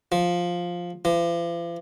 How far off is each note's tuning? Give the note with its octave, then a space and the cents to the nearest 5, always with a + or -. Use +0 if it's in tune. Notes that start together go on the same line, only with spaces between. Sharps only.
F3 +5
F3 -45